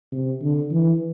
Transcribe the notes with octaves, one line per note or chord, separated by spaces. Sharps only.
C3
D3
E3